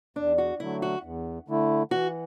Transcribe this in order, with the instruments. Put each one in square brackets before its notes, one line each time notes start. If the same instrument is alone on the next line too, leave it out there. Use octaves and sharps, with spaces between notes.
[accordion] E2 [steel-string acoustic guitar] D4
[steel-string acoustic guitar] F#4
[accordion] D3 F#3 A3 [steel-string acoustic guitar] E4
[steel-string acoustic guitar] F#4
[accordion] E2
D3 A3 E4
[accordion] E3 [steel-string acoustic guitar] F#4